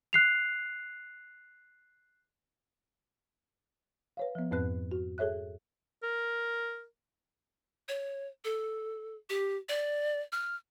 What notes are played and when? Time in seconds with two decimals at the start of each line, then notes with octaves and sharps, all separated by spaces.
0.13 F#6 C7 F7
4.17 B4 C#5 F5
4.35 F3 B3
4.51 F2 G#2 C4 B4 F#6
4.92 F#4
5.18 G#4 A4 C#5 E5 F#6
6.03 A#4
7.88 C#5
8.44 A4
9.30 G4
9.69 D5
10.32 F6